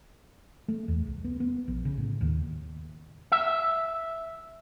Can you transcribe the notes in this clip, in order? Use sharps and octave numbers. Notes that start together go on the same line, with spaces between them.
A3
E2
C2
B3
B3
A#1
C#3
A2
D#2
E5